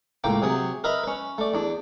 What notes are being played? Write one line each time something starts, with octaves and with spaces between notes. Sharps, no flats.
C#2 A2 A#3 G5 D6
C3 F#3 G#4 D#6
A#4 B4 D#5 E5 A#5 B5
C#4 B4
A3 D5
E2 D4